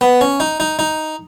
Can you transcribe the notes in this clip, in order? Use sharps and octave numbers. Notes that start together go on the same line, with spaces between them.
B3
C#4
D#4
D#4
D#4